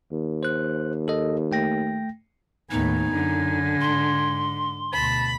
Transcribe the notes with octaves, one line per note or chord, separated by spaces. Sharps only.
D#2
C5 F#6
A4 D#5
A3 G5 A#6
D#2 A2 B3 D#4 G#5
F#2 D3
G#2 C6
D2 B2 A5 B5